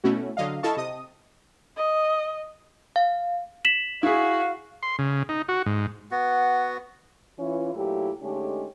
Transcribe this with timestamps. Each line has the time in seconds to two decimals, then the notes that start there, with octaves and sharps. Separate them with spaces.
0.04 B2 A3 C#4 E4 F#4
0.37 D3 F#3 D#5 F5
0.63 E4 A4 D#5 F5 A5 C#6
0.77 C3 D#5 D#6
1.77 D#5
2.96 F5
3.65 B6 E7 F#7
4.03 E4 F#4 G#4 F5
4.83 C6
4.99 C#3
5.29 D#4
5.49 F#4
5.66 G#2
6.11 B3 F#4
7.39 E3 C#4 F4
7.74 A#2 F#3 A3 E4 G4
8.22 D3 G#3 A3 C#4 D#4 G4